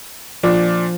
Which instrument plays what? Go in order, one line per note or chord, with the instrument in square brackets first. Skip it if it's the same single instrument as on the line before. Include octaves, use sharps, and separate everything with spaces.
[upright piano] A#2 D4 [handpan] F3